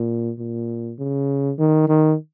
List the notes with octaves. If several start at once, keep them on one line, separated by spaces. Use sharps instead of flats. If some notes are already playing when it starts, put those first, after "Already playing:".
Already playing: A#2
A#2
C#3
D#3
D#3